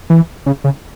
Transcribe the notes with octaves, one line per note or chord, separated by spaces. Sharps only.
E3
C#3
C#3